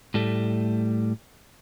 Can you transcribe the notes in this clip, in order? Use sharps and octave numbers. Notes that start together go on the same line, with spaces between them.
A2 G3 A3